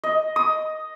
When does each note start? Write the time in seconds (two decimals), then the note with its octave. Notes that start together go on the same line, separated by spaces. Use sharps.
0.04 D#5
0.36 D#6